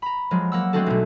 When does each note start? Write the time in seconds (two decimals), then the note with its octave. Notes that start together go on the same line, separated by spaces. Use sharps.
0.02 A#5 B5
0.31 F3 F#3 G#3
0.52 A#3 F#5 E6
0.73 G#3 A3 C4 D4 F#4 A4
0.86 B1 B2